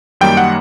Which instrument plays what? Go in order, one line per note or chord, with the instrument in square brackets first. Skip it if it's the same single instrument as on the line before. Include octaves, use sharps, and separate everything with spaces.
[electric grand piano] F#2 D#3 G3 A#3 G5
F#5